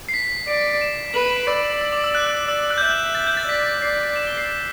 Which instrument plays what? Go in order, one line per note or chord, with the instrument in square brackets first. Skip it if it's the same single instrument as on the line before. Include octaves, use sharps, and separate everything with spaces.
[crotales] C7
B6
[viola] D5 [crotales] D7
[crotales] E7
[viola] B4 [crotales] F#7
[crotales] E7
D7
[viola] D5 [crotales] E6
[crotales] E6
D6
E6
F#6
F#6
E6
[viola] D5 [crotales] E6
[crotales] F#6
G6
[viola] E5 [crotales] F#6
[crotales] A6
G6
A6
[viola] D5 [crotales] B6
[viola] D5 [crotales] C7
[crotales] E7
G7
C7